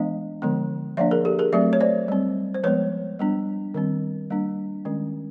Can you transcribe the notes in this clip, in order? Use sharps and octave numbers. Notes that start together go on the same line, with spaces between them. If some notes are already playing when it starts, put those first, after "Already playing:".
Already playing: E3 G#3 B3 D4 D#5 F5
D3 F3 G#3 B3
F3 A#3 D4 D5 E5
G#4 A#4
G4 A4
G#4 A#4
F#3 A3 C4 D5 E5
C#5
C5 D5
G3 C4
C5
F3 G#3 B3 B4 C#5
G3 B3 D4
D#3 G3 C4
G3 A#3 D4
D#3 G#3 C#4